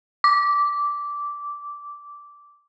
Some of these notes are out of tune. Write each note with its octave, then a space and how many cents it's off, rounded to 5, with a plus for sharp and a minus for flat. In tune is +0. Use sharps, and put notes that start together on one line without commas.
D6 -10